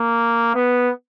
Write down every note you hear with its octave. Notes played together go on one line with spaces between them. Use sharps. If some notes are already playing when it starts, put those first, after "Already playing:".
Already playing: A#3
B3